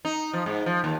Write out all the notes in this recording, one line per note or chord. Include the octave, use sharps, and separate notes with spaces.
D#4
F3
G#2
F3
D#2